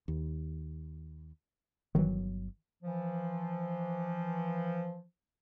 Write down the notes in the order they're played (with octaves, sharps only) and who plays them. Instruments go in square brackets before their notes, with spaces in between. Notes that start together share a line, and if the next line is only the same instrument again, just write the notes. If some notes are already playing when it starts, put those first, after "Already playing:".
[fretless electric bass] D#2
[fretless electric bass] G1 F#3 [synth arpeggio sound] D#3 E3
[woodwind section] E3 F3